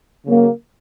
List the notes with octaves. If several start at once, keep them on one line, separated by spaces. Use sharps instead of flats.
C#3 F#3 A#3 C#4 F#4